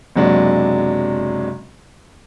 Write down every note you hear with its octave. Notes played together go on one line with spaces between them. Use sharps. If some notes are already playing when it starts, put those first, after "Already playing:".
F#1 C3 F#3 G#3 D4